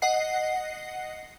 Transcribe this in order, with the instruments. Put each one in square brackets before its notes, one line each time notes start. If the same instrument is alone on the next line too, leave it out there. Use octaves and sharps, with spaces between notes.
[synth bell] D#5 F#5 C7